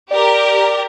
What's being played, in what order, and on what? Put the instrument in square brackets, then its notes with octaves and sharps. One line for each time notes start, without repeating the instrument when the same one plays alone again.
[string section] G4 A#4 [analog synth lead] D5